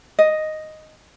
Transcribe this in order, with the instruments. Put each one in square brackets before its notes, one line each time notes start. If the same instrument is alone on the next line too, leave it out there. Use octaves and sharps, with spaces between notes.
[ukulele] D#5